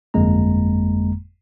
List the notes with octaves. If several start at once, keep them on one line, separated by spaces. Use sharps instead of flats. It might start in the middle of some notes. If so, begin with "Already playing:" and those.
G1 F2 G#3 A#3 A#5